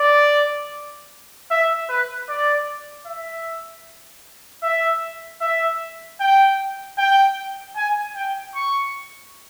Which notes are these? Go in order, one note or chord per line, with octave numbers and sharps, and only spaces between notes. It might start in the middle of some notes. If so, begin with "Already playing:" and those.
Already playing: D5
E5
B4
D5
E5
E5
E5
G5
G5
G#5
G5
C#6